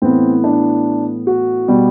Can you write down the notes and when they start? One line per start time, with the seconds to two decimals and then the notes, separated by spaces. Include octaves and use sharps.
0.02 A2 E3 B3 C4
0.44 D4
1.27 F#4
1.68 B2 G3 B3